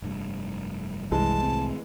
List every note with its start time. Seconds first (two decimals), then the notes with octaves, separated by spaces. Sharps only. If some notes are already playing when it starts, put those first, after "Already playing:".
0.02 F1 G2
1.11 C2 E3 G#3 A5
1.43 G#1 A2 C4